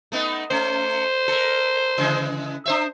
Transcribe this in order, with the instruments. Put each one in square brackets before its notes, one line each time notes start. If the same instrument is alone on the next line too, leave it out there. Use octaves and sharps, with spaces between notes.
[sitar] A3 B3 D#4
[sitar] A3 C#4 [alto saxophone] C5
[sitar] A4 A#4
C#3 E3 G#3
D4 C5 E5